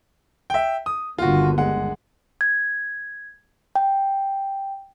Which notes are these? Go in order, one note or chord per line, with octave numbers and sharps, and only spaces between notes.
E5 G5
D#6
G1 D#2 D3 F4 F#4
G#3 F#5
G#6
G5